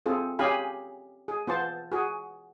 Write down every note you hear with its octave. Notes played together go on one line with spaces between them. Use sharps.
C4 F4 G#4 A4
C#4 G4 G#4 F5 G#5 B5
G#4
B3 F4 C5 A5
F#4 G#4